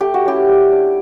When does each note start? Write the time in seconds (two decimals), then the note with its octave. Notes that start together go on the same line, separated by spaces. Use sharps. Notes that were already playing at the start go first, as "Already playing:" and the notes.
0.01 A3 G4
0.14 F#4
0.25 C#4 E4 G4
0.48 G3
0.72 D4